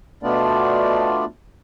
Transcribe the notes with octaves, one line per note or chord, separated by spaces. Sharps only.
B2 A3 B3 D4 F4 D5